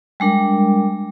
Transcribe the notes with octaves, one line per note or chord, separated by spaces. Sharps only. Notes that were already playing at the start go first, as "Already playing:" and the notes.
G3 G#3 D4 A#4